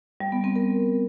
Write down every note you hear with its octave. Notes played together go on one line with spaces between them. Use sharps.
G3
B3
C4
A#4